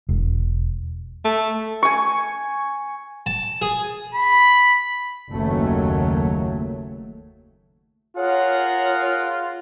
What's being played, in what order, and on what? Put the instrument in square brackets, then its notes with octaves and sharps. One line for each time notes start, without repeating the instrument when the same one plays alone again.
[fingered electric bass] E1
[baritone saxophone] A3
[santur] G#5 C#6
[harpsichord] A5
G#4
[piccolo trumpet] B5
[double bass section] F#1 D#2 F#3 A3
[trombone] F4 [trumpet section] G#4 A#4 F#5 [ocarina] C#5